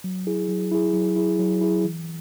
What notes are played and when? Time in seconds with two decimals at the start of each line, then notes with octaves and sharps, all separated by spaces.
0.04 F#3
0.27 E4 G#4
0.48 F#3
0.71 E4 G#4
0.94 F#3
1.16 E4 G#4
1.39 F#3
1.61 E4 G#4
1.85 E3